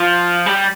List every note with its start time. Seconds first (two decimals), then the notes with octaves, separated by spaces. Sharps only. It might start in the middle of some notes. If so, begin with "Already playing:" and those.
Already playing: F3
0.46 G3